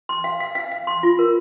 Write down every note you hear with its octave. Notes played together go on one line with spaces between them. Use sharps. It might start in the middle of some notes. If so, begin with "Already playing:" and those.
C6
F5
F5
F5
F5
C6
F4
A#4